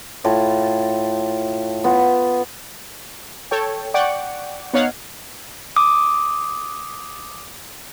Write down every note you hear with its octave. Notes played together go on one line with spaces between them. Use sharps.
A2 F4 A5
B3 F4
A4 C#5 G5
D5 F#5 G5 C#6 D6
B3 D#4 C#5 F5 F#5
D6 D#6